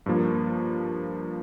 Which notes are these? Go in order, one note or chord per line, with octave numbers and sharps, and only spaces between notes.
G2 F3 A#3